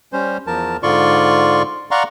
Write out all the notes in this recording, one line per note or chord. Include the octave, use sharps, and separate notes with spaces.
G3 C#4 C5
E2 F3 A#4 A5
G#2 D3 F4 D5 C6 C#6
D5 F5 F#5 A#5 C6 C#6